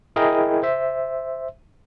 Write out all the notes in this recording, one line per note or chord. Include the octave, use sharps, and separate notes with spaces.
E4 G#4 A#4 D#5 G5
C5 E5